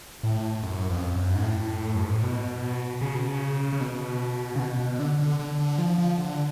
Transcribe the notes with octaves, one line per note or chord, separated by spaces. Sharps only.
A2
F#2
F2
F#2
G#2
A2
F#2
G#2
A2
B2
C#3
B2
C#3
C#3
B2
C#3
B2
B2
D3
D3
D3
D3
F3
F3
D3